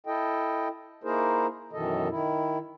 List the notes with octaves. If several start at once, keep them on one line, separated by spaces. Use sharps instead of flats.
E4 A4 D#5 G5
A#3 D#4 E4 G#4 A#4 C5
F#2 B2 D#3 E3 A4 D#5
D#3 E4